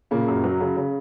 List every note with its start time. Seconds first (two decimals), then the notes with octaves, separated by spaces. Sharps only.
0.11 A#2 C#3 A#3
0.28 F#2
0.44 F#3
0.61 C#3
0.77 C#3